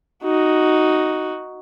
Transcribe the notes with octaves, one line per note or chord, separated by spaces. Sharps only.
D#4 F#4